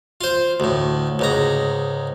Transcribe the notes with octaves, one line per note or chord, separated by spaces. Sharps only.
F4 C5
D2 A2
C#2 G#2 A#5